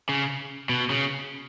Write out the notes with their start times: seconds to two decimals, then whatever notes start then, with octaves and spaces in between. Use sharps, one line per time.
0.09 C#3
0.69 B2
0.90 C#3